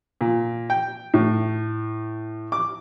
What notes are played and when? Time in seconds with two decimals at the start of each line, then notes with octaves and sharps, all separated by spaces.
0.21 A#2
0.70 G5
1.14 A2
2.52 D6